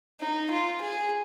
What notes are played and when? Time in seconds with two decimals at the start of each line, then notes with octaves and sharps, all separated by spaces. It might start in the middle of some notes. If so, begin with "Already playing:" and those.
0.20 D#4
0.51 F4
0.81 G#4